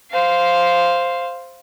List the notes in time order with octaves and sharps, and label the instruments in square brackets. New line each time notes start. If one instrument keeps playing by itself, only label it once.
[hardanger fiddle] C5 F5